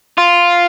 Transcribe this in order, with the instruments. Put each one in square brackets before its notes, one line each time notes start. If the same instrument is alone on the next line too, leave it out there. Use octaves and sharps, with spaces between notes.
[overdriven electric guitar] F4